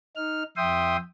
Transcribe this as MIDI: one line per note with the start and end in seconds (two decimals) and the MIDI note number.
0.16 0.43 63
0.16 0.43 89
0.57 0.97 41
0.57 0.97 76
0.57 0.97 79
0.57 0.97 84
0.57 0.97 87